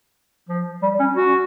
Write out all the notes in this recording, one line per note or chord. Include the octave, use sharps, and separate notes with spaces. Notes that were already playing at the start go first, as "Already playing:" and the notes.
F3
G3
C#4
F#4